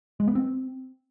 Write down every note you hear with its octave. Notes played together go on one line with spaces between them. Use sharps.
G#3
B3
C4